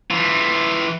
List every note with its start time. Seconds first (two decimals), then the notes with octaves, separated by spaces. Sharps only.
0.11 E3 F4